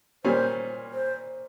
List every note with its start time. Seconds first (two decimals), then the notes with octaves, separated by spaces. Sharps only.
0.24 A#2 G3 A#3 C#4 C5
0.93 C5